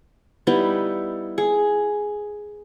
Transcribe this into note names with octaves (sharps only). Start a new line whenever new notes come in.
G3 B3 D#4 E4
G#4